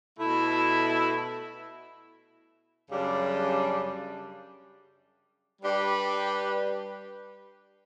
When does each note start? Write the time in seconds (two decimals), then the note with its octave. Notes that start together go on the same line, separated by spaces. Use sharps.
0.19 B2 A3 E4
2.90 F#2 C#3 G3 D4
5.62 G3 D4 G4 B4